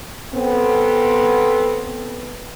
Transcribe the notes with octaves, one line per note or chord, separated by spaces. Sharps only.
B3 C4 A4